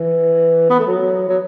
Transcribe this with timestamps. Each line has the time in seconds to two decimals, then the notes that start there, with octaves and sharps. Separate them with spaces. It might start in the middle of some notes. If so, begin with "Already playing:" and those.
Already playing: E3
0.70 B3
0.79 A3
0.87 F#3
1.29 F#3